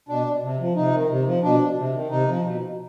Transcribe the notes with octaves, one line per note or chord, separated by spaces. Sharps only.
B2 D4
C3
F3
C3 D#4
D#3
C3
F3
B2 D4
C3
D#3
C3 D#4
F3
B2